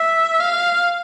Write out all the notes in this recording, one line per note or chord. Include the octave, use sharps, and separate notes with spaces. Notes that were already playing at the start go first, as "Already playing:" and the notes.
Already playing: E5
F5